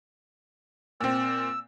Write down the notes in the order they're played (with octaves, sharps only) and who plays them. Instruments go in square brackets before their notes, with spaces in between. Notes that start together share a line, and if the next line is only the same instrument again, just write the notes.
[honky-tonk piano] A#2 C4 [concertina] E6